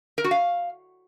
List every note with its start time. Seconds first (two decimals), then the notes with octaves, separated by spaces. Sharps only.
0.18 A#4
0.24 F#4
0.31 F5